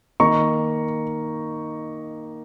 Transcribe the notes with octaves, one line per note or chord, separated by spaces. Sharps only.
D#3 A#3 D#4 A#5 C#6